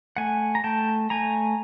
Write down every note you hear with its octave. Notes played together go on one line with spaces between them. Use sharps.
A3 F#5 G#5
A#5
A3 G5 A5
A3 G#5 A#5